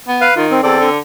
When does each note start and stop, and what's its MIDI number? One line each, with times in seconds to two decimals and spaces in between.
0.08 0.26 59
0.21 0.34 71
0.21 0.34 77
0.36 0.60 51
0.36 0.47 65
0.51 0.61 60
0.63 0.80 40
0.63 0.89 60
0.63 0.89 69
0.63 0.89 74
0.80 0.99 50